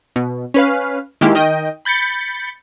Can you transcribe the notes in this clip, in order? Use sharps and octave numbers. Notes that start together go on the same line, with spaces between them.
B2
C#4 B4 F5
D#3 G#3 A#3 E4 G4
D#3 D#5 G5
B5 G6 A6 C#7